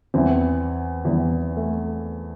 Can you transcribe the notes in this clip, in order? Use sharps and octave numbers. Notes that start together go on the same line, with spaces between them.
E2 E3 C4
E2 E3
A3